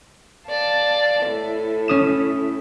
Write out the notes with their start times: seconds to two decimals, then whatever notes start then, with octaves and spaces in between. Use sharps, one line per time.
0.47 D5 F5 A5
1.25 A2 E4
1.88 C#4 D#6 E7